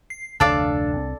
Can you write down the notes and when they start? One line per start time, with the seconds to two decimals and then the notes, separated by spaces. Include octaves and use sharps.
0.10 C7
0.40 F1 D2 D4 A4 D5 F5
0.96 C2 C4